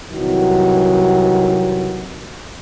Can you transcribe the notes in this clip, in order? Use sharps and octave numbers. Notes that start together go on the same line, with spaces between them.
C2 D#3 E3 F#3